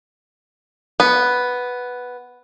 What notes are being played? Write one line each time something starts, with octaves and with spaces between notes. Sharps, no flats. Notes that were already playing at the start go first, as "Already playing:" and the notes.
B3